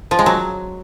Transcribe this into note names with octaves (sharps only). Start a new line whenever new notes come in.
F3
G#3
F#3